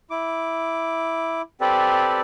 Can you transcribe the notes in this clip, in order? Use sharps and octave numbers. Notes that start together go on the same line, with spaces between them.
E4 D6
C4 G4 A4 B4 D5